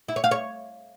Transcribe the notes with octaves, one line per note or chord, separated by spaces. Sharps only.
E4
C#5
F5
C#5